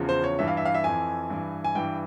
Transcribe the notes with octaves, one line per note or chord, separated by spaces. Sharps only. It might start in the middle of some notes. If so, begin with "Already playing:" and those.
Already playing: E2 C#3 F3
C5
C#5
G2 E3 E5
F5
E5
F5
E5
F2 E3 G#5
G2 E3
G#5
G2 E3 G5